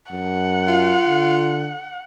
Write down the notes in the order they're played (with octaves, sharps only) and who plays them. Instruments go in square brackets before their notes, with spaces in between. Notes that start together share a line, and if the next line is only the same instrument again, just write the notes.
[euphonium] F#2 [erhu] F#5
[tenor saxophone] F4
[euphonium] D3